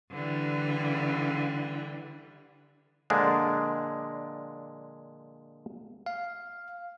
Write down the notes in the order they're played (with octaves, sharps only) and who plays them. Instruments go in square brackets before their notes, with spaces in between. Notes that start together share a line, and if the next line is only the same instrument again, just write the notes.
[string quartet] D3 E3 G3
[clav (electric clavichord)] A#2 D3 F3 G#3 D4
[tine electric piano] F5